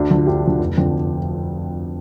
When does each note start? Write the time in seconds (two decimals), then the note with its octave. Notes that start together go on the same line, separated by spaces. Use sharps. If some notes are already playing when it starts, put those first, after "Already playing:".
Already playing: D2 D4
0.11 D3 F3
0.26 D2 G4
0.44 D3 F3
0.60 F1
0.77 F2 D3